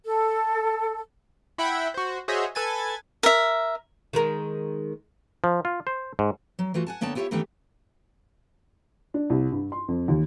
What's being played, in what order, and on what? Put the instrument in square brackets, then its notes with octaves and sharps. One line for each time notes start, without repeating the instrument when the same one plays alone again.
[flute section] A4
[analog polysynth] E4 E5 F#5 G5 B5
F#4 C5
F#4 G#4 C5 C#5 D#5 E5
A4 B4 G#5 G#6 A6
[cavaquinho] A#4 E5
[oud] D#3 G#3 A#4
[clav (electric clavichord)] F3
F4
C5
G#2
[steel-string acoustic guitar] F#3
E3 A3 F4 F#4
F#5 G#5 A5
D3 A#3 B3 C#5 G5 A5
E4 F4 G4 C#5 E5
D#3 E3 A3 B3 C#4 G4
[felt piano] D4
C2
G2
C6
F2
D#2